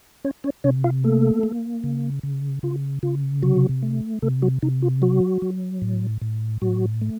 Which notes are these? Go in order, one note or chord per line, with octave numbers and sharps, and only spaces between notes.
C#4 C#5
C#4 C#5
C3 C#4 C#5
F4 F5
A3 A#3 A4
A#3
C#3
C#3
C#3 F4
C#3 F4
C3 F#3 F#4
A3
C3 A3 A4
F#3 F#4
C3 D#4
F4
F#3 F#4
F#3
A2
A2
A2 F#3 F#4
A3